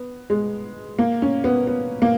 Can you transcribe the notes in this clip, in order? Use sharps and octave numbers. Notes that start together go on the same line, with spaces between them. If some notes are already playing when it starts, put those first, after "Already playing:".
Already playing: B3
G#3
A#3
C#4
B3
B3
A#3